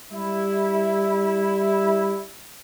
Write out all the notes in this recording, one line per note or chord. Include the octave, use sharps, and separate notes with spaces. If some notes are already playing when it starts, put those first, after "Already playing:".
G3 E4